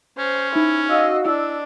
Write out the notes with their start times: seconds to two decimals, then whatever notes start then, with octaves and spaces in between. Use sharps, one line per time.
0.19 C#4 C5
0.56 D#4 E4
0.89 F#4 D#5 F5 E6
1.25 D4 E4 E6